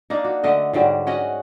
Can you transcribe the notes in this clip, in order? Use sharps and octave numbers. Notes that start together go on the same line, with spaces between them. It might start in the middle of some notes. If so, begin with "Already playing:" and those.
A#3 D4 D#4
F#4
D3 A3 D#5
G#2 D3 F#3 G3
C#4 F#4 D#5 F#5